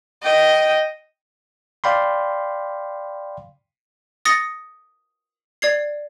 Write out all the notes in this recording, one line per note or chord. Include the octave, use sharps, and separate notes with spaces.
D#5 G5
D5 F5 G5 B5 C6
D#6 A6 A#6 C#7
D5 G#6 C7